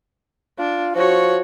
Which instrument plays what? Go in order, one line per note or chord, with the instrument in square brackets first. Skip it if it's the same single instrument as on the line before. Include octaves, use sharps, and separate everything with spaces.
[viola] D4 [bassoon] F4
[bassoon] F3 [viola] F#4 C#5